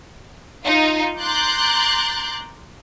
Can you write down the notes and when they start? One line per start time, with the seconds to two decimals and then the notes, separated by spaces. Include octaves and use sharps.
0.66 D#4 F4
1.20 A#5 C6 D6 F#6 G6 A6